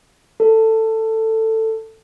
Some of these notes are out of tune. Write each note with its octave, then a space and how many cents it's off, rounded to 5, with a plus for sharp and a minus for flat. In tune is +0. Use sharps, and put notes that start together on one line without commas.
A4 +15